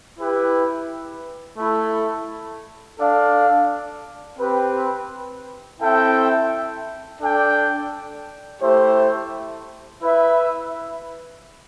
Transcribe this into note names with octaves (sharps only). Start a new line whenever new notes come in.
E4 G4 B4
A3 E4 A4
D4 A4 D5 F5
C4 G4 B4
C4 E4 A4 E5 G5
D4 A4 D5 G5
A3 E4 G4 C5
E4 B4 E5